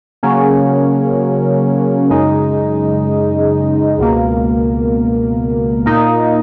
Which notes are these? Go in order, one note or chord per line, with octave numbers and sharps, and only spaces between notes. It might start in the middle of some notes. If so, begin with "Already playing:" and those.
C#3 F#3 A#3 C#4
F#2 C#3 G#3 D#4
C#2 B2 A#3
A#2 A#3 D#4